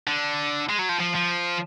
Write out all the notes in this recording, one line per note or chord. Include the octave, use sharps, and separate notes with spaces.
D3
G#3
F#3
F3
F3
F3